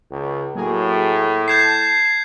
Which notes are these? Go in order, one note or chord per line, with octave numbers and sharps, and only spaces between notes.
C#2
A2 F#3 A#3 G#4
A5 G6 G#6 C7